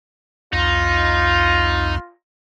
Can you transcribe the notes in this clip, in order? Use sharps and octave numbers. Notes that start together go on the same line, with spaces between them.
C2 F2 D#4 F4